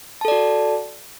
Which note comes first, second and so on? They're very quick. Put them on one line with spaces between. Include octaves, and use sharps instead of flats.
A5 A4 D5 F#4